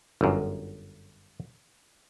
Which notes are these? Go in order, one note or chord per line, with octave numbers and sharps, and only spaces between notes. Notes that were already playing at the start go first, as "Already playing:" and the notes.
G1 F#2